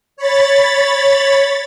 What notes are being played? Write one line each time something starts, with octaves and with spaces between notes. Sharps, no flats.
C#5 B5 A6